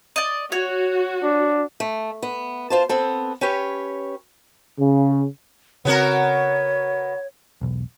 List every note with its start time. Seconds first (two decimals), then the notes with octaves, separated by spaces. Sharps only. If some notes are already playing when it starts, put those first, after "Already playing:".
0.16 D5 D#5
0.52 F#4 C#5
1.23 D4
1.80 A3
2.22 B3
2.70 F4 C5 A5
2.89 B3 C4 A4
3.41 C#4 G4 B4 C#5
4.79 C#3
5.85 C#3 B3 C4 F#4 A#4 C#5
7.61 E1 B1